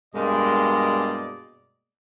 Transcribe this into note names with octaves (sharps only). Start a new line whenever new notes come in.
G2 B2 G#3 A#3 D5 D#5